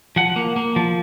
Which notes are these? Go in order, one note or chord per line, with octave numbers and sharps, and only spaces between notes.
F3 F#5
A#3
A#3
F3